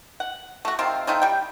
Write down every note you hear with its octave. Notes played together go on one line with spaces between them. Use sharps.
F#5
A3 F#4
C3 D#3 C4 F4
A3 C4 D#4 F4
G3 G5